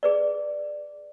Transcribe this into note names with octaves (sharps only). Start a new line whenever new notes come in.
G#4 B4 D5